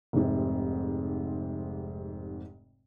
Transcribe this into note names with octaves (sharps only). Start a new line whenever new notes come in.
F1 G#2 C3